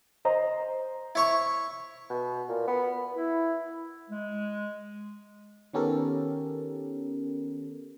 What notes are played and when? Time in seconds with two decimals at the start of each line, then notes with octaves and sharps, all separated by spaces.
0.25 C5 D#5 A#5
1.15 E4 C#5 C#6
2.10 B2
2.49 A#2
2.67 B3
3.14 E4
4.09 G#3
5.73 D#3 B3 C#4 G4 A4 A#4